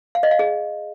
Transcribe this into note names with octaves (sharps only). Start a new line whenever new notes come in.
F5
D#5
F5
G#4